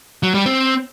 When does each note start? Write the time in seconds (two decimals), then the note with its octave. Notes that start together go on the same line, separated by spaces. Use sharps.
0.23 F#3
0.34 G3
0.46 C4